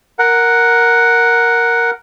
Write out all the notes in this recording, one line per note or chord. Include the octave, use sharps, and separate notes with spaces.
A#4 F#5